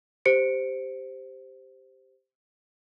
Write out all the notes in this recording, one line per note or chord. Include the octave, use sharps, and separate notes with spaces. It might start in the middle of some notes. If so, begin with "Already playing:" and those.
G4 C5 C#7 D7